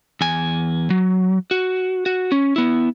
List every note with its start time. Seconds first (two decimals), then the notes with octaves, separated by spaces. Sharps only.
0.21 E2 G#5
0.90 F#3
1.51 F#4
2.06 F#4
2.32 C#4
2.56 B3 E4